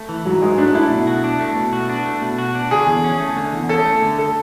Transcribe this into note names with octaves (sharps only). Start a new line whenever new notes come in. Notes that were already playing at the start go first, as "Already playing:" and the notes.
Already playing: A3
E3
G#2 F#3
G#2 G#3
A3 D4
A3 E4
B2
F#4
D4
A3
B2
F#4
D4
A3
B2
F#4
D4
D3 G#4
E2
C#4
A3
D3
E2
C#4 A4
A3
D3
A4